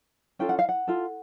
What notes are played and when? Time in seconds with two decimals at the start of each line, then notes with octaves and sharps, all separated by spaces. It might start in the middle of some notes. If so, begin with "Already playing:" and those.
0.39 C#4 F4 A4 G5
0.49 F#5
0.59 F5
0.69 F#5
0.87 F4 A4